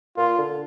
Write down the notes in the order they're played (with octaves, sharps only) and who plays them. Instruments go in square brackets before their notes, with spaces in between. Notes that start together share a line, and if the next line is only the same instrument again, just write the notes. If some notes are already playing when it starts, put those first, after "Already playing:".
[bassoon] A#2 [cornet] F4
[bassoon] D3